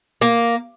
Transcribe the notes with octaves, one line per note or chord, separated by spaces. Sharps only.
A#3